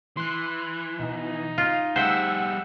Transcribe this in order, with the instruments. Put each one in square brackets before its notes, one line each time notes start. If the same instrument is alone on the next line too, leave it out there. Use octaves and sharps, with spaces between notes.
[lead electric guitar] E3 [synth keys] C6 F#6
[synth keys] B2 [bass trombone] D#4
[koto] F4
[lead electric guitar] G3 G#4 [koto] C5 E5 [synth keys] F#5 G5 E6